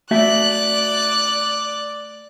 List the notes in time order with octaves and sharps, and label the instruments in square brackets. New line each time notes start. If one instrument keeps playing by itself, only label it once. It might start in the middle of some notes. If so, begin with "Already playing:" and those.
[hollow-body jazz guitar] A3 F#4 E5 [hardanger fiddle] D5 [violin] F#6